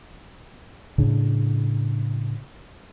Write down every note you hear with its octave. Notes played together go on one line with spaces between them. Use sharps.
A2 C#3 D4